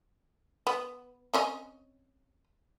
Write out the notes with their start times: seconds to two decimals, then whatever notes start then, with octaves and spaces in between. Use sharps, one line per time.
0.67 B3
1.34 C4 C#4 D#5